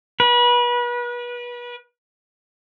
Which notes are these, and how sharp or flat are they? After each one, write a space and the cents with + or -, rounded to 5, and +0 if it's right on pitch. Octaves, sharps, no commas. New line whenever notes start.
B4 -30